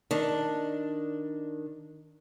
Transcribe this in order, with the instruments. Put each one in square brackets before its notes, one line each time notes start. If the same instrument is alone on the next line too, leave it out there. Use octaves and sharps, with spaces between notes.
[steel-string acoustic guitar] D#3 D4